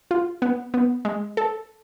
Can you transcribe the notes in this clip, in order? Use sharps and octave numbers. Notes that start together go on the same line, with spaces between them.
F4
B3
B3
G#3
A4